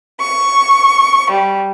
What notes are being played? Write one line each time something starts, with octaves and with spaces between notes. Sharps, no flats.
C#6
G3